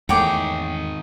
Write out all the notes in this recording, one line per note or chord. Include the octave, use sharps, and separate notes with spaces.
E2 G#2 D#3 A3 G#4 C#5 G5 D6